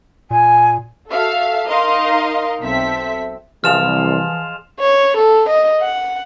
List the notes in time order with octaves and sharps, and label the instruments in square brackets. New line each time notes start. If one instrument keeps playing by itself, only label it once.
[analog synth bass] A#2 [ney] G#5
[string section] F#4 A4 E5 F5
D#4 A#4 D#5 F5 C6
B1 C4 A4 E5 B6
[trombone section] C2 [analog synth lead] E3 [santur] F3 G#3 F4 [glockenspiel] F6 E7 F7
[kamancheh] C#5
A4
D#5
F#5